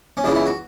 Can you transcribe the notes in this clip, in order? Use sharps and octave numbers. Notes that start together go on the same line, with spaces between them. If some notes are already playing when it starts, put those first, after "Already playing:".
C#4
C#2 C#3 E3 D4
E4
F#4